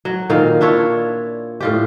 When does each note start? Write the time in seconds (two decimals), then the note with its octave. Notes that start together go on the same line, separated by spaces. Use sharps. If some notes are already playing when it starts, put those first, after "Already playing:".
0.05 F#3
0.30 A#2 D#3 F5
0.61 D4 E4 F4 C#5
1.61 A2 F4 G4